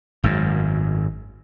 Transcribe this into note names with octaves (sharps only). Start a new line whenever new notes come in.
G#1 F#2